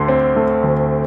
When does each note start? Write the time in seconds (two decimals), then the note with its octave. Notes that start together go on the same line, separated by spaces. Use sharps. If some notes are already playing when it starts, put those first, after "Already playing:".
Already playing: D2 D3 A3 C6
0.08 C4
0.36 A3
0.64 D2